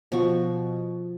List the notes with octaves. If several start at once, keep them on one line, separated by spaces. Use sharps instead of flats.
B2 F3 F#4 C#6